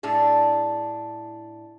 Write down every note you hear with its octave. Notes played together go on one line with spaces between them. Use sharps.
A2 D4 G#4